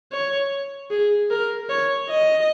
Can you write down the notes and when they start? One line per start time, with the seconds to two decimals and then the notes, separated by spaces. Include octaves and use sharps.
0.13 C#5
0.91 G#4
1.31 A#4
1.70 C#5
2.09 D#5